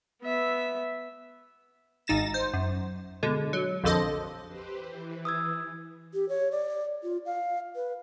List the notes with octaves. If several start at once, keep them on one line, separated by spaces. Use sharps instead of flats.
B3 E5
G#1 G#2 D#4 A6 A#6 E7
C5
F#2
B2 D3 G#3
F#3
A#1 F2 D3 A4 C5 D#5
G4 B4 C5
E3
D#6 E6 G#6
G4
C#5
D5
F4
F5
B4